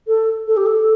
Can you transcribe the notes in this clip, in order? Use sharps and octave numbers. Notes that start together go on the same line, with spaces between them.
A4
A4
G4
A4